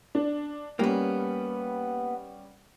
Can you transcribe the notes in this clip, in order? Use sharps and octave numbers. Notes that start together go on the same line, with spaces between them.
D4
G3 A#3 B3 C#4